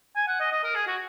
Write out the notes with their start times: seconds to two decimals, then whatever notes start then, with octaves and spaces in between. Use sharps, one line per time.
0.16 G#5
0.28 F#5
0.40 D#5
0.52 D#5
0.64 A#4
0.75 G#4
0.87 F#4